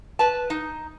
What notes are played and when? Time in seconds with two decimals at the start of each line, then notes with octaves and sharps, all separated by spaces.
0.19 B4 A5
0.50 D#4